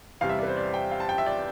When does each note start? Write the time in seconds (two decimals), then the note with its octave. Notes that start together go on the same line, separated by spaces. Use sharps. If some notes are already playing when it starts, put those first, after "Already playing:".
0.21 E2 C3 G3 F5
0.29 E5
0.39 B4 D5
0.48 C5
0.57 D5
0.74 G5
0.92 F5
1.00 A5
1.09 G5
1.18 E5
1.26 D5